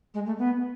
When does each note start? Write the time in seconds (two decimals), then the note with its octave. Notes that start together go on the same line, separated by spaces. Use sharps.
0.14 G#3
0.26 A3
0.39 B3